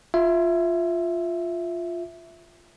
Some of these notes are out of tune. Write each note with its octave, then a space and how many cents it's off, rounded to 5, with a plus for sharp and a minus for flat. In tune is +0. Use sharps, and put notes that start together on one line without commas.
F4 +0 E5 +0